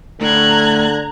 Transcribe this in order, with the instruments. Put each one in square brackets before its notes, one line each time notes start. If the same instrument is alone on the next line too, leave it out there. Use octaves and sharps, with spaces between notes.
[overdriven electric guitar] A2 [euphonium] D3 [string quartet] A#5 F#6 G#6